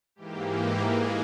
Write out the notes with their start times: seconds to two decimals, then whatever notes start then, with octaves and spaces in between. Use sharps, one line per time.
0.16 G#2 E3 A#3 G4
0.47 G4
0.80 G#4